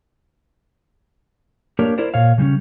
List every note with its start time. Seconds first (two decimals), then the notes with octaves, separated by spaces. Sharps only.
1.79 A#3 D4 G4 A#4 C#5
1.98 E4 A#4 C5 D5
2.14 A#2 C#5 F5
2.38 C#3 G3 C4 C#4